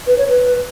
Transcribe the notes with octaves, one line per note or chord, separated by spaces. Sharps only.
B4
C#5
B4